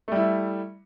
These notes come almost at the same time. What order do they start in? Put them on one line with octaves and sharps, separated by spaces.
A3 G3 E4